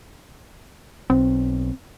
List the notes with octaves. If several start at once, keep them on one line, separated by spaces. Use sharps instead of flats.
B1 C4